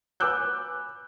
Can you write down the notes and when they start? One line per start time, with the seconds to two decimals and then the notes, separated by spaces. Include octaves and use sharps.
0.20 B4 G#5 D6 E6 F#6 G6